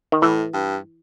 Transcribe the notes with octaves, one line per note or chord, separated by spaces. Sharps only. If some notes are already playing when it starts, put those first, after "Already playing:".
D#3
A2 E3
G2